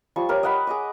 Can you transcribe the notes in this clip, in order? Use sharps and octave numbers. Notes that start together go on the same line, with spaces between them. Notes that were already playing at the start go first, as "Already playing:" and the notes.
F3 G3 C#6
G4 A#4 C#5
D#5 F#5 B5
G#4 D#5 D6